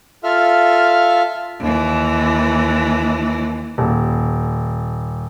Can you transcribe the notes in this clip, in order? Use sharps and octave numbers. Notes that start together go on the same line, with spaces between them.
F4 A4 E5 F5 F6
D#2 E3
D#1